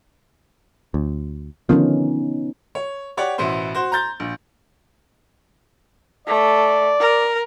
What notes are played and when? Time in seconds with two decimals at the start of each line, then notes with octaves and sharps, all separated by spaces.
0.94 D2
1.69 D3 D#3 F3 B3 C#4 D#4
2.75 C#5
3.17 G4 C#5 D5 F#5
3.38 A1 B2 B3 E4 C5
3.74 F#4 C5
3.92 A#5 C6 G6 A6
4.20 A#1
6.27 A3 D5
7.00 A#4